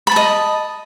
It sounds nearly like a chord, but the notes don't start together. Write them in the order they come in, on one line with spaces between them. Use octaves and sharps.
B5 A5 D#5